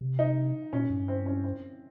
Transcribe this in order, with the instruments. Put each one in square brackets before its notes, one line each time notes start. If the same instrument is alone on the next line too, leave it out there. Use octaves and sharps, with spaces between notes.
[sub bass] C3
[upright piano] D#4
[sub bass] A#2 [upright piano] C#4
[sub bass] G2
[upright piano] C4
C#4
C4